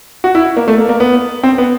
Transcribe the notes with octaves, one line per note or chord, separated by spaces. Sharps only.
F#4
E4
A#3
A3
A#3
A#3
B3
C4
B3